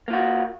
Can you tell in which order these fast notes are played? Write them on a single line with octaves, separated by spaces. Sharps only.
A#3 F4 F#4